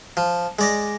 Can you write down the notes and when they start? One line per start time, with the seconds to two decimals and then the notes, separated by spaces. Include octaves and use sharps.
0.17 F3
0.59 G#3 D5 D#5